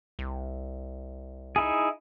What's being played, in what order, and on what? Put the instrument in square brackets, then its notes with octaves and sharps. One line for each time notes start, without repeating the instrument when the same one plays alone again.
[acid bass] C2
[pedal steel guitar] D#4 E4 G#4